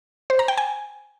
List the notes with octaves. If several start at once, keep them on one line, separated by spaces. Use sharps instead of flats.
C5
A#5
G5
G#5